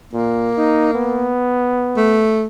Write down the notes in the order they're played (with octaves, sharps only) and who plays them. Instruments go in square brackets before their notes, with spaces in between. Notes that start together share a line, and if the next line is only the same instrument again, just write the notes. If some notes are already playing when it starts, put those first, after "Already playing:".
[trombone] A#2 [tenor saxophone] A#3
[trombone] D#4
B3
[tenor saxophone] A3